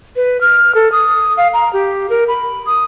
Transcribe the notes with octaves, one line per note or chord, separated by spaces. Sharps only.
B4
F6
A4
D#6
F5
A#5
G4
A#4
B5
D#6